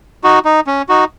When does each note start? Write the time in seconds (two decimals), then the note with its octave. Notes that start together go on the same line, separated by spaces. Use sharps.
0.24 D#4 F#4
0.45 D#4
0.67 C#4
0.89 D#4 F#4